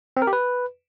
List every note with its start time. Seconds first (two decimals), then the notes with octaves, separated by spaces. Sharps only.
0.17 C4
0.22 A#4
0.27 G4
0.33 B4